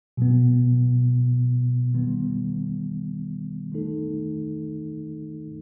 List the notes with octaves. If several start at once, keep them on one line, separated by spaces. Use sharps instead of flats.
B2 F#3 B3
D#3 G3 B3
D#3 A3 D#4 A4